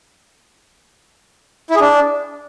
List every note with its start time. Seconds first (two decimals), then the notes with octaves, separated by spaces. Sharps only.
1.70 E4
1.76 G#4
1.81 D4